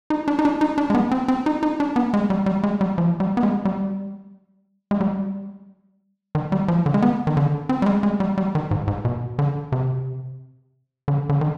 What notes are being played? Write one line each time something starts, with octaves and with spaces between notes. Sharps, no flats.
D#4
D4
D#4
D4
D#4
D4
G#3
B3
C4
C4
D#4
D#4
D4
B3
G#3
G3
G3
G#3
G3
F3
G3
B3
G#3
G3
G#3
G3
D#3
G3
F3
D3
G#3
B3
D#3
D3
C4
G3
G#3
G#3
G3
G3
D#3
G#2
G#2
B2
D3
C3
D3
D3
D#3